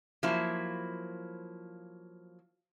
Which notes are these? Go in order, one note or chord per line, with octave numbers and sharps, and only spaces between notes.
F3 F#3 A#3 E4 C5